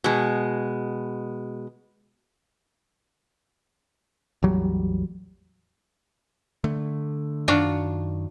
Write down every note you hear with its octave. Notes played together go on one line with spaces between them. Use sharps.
B2 G#3
A1 E2 F#3 G3
D3 A3
F#2 D#3 D4 F4 F#4